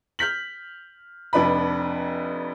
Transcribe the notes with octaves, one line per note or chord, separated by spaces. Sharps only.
F6 G6 B6 F#7
F1 F2 D4 B4 B5